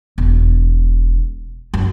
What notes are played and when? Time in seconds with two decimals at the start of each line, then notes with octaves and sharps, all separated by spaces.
0.18 E1
1.74 F#2